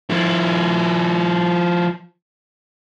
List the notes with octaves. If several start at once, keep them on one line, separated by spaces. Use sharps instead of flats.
F3 E4